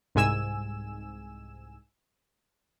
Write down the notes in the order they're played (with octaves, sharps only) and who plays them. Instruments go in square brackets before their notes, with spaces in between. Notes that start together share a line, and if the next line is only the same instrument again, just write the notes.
[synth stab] C2 G#2 G#5 E6 E7